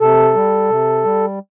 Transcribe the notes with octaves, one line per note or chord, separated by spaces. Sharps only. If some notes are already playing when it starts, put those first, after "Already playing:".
C3 A4
G3
C3
G3